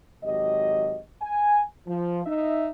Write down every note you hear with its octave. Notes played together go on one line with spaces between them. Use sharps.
G#1 F#3 G4 D#5
G#5
F3
D#4 D#5 E5